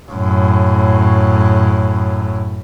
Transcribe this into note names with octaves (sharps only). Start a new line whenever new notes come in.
F#2 A2